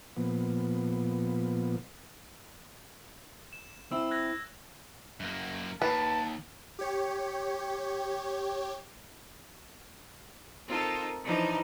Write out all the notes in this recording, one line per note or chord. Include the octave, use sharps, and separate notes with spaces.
A#2 F3 B3
E7
C4 E4 E6
F#6 G#6 A#6
F#2 A#3
D#2 B4 A5
G4 C#5
C4 D#4 F4 A4 A#4
E3 F3 D4 D#4